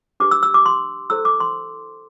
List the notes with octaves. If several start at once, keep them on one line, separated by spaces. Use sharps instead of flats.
D4 G4 B4 D6
E6
E6
D6
C6
E4 A4 C5 E6
D6
C6